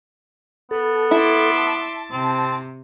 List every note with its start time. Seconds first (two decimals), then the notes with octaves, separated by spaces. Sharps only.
0.71 B3 A4
1.11 E4 E5 C6 D6
1.58 A5
2.11 C3 C4